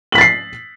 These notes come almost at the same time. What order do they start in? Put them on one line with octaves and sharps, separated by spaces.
F#7 B6 A6 C7